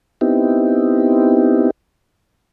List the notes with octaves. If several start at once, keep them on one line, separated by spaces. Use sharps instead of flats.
B3 C4 D#4 E4 G4